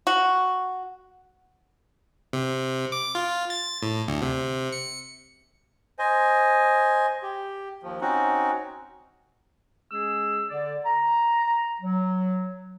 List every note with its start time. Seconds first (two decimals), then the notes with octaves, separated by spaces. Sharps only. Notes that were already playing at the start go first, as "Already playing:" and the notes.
0.07 F#4
2.33 C3
2.92 D6
3.15 F4
3.50 A6
3.82 A2
4.08 D2
4.22 C3
4.72 C#7
5.99 C5 D#5 G#5
7.23 G4
7.83 D#2 F3
8.01 C4 C#4 D#4 F#4
9.91 G#3 C#4 G#4 E6
10.49 D3 D5
10.86 A#5
11.81 F#3